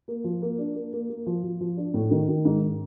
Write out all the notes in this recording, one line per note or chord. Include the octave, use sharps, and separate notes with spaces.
A#3
F3
A#3
D4
A#3
A#3
A#3
F3
F3
F3
D4
A2
D#3
D#3
G#2